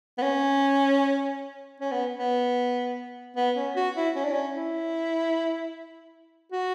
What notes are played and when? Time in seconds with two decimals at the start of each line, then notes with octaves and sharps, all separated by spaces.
0.18 B3
0.22 C#4
1.80 C#4
1.92 B3
2.17 B3
3.36 B3
3.56 C#4
3.76 F#4
3.96 E4
4.16 C#4
4.24 D4
4.32 C#4
4.55 E4
6.52 F#4